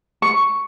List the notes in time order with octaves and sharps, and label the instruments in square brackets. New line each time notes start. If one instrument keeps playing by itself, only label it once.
[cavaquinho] C#6